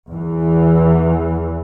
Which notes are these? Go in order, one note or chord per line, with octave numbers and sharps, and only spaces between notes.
E2 E3